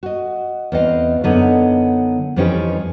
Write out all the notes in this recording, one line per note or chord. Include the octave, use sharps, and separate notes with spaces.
F#4 D#5
E2 C4 D#5 F5
F#2 D3 B3 D#4 C#5 D#5
F2 E3 F3 C#4 D#4 G4